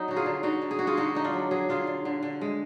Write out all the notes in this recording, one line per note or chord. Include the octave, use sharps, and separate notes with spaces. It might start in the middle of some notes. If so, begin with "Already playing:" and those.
Already playing: F#3 D#4
D3 F#4
F4 G#4
D3
D3 D#4 F#4
D3
G#4
D3 F#4
F4 G#4
D3 D#4 F#4
D3 D#4
D4 F4
F#3
F#3 G#4
D3 F4 G#4
D3
D3
D3
G#3